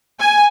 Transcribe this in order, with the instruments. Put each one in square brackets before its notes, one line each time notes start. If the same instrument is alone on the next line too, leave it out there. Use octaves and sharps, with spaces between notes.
[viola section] G#5